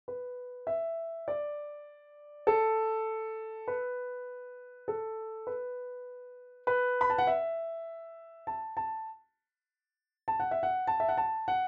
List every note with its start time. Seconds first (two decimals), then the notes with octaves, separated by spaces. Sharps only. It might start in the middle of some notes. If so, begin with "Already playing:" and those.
0.08 B4
0.67 E5
1.28 D5
2.47 A4
3.68 B4
4.88 A4
5.47 B4
6.67 B4
7.01 B5
7.10 A5
7.18 F#5
7.27 E5
8.47 A5
8.77 A5
10.28 A5
10.40 F#5
10.51 E5
10.63 F#5
10.87 A5
11.00 E5
11.09 F#5
11.17 A5
11.48 F#5